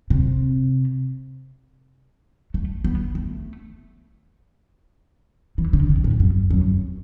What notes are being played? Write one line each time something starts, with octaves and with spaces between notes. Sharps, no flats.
C3
A3
B3
A3
E3
D3
C3
A2
F#2
F#2